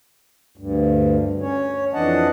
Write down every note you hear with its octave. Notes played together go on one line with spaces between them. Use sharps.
D2 G2
C#4 C#5
F2 E3 D4 D#5 F#5 A5